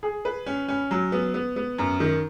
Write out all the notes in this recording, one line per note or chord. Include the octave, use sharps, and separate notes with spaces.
G#4
B4
C#4
C#4
F#3
B3
B3
B3
F#2
D#3